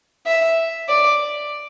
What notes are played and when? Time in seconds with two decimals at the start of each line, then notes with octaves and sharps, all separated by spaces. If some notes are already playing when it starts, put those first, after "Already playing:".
0.26 E5
0.89 D5